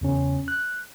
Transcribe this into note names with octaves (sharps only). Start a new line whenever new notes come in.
E2 C#3 C#4
F#6